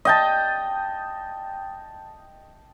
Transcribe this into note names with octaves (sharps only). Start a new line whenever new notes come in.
D#5 G5 A5